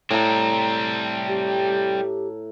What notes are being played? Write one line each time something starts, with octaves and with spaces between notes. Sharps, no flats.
A2 G3 C4 A#5
G4